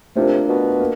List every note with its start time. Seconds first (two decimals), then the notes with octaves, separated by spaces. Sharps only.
0.15 C3 A3 D4 F4 A#4
0.48 B2
0.80 A#3